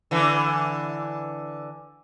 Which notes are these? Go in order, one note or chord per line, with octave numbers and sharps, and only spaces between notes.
D3 E3